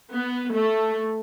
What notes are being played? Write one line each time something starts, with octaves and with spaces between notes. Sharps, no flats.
B3
A3